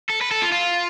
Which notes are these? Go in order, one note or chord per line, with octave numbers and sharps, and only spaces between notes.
A4
B4
A4
F4
F4